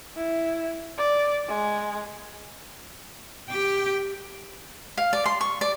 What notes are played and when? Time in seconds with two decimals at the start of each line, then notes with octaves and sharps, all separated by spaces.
0.17 E4
0.98 D5
1.48 G#3
3.51 G4 G5
4.98 F5
5.13 D5
5.26 C6
5.41 C#6
5.61 D5